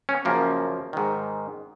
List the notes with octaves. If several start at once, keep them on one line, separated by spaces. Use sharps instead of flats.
C#4
F#2 C#3 F3 A#3
G#2 D#3